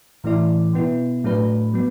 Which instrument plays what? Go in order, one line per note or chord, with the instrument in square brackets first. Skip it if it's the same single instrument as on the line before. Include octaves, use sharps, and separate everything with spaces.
[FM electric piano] A2 E3 A3 E4 D5
B2 B3 E4
A2 F#3 A3 D4 B4
F#3 B3